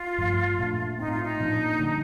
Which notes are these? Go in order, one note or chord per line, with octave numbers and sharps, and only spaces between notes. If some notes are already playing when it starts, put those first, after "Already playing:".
Already playing: F4
G2 F3 A3
A#2 A3 D4
A2 A3 C4 D#4
F4
D#4
A#2 F3 A#3 D4
D3 G3 D4